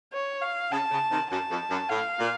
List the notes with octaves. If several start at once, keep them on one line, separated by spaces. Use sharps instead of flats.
C#5
F5
C#3 A5
C#3
C3 D#3
F#2 A5
F2
F#2
A2 F5
A#2